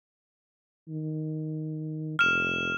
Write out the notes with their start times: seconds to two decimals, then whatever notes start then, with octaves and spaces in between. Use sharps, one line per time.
0.89 D#3
2.19 F1 F6 E7